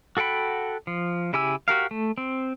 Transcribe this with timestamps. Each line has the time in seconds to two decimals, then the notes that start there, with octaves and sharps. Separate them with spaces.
0.17 F#4 A4 F#5 G5 B5
0.87 F3
1.33 C#3 E4 G4 G#5 E6
1.68 F#4 G4 A#4 F5
1.91 A3
2.18 C4